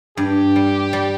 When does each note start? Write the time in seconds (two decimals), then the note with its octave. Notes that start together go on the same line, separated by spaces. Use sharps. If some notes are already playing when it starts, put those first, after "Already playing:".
0.17 G2 G4
0.56 G3
0.93 G3